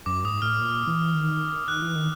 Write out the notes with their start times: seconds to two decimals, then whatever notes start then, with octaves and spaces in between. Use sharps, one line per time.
0.06 F#2 D6
0.24 G#2 D#6
0.42 A2 F6
0.60 A#2
0.87 E3
1.14 D#3
1.68 D#3 F#6
1.82 E3
1.95 D#3